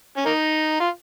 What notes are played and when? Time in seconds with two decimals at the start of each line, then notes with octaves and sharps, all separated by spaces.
0.17 C#4
0.25 A#3 D#4
0.80 F4